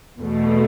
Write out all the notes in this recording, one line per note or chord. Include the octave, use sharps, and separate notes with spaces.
E2 B2 A3